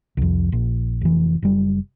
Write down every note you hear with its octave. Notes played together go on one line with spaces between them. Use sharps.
C2 F2
A#1
F1 E3
F#1 G3